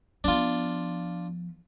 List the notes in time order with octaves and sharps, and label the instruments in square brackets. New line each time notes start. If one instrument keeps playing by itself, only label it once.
[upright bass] F3 B3 [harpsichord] D4 F4